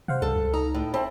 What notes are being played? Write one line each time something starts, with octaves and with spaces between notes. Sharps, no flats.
C3 C5 F5 F#5
C#2 G2 A4
C#2
D#4 A4 D#5 A#5
A2
C4 E5 A5 B5